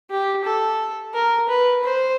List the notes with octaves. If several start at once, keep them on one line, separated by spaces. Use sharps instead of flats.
G4
A4
A#4
B4
C5